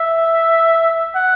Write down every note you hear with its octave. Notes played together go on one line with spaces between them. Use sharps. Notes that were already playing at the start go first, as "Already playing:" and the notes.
Already playing: E5
F#5